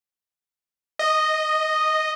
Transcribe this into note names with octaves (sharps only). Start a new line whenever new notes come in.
D#5